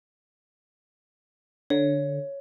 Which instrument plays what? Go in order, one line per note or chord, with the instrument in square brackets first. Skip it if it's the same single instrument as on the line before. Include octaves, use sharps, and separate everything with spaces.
[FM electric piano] D3 [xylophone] C#5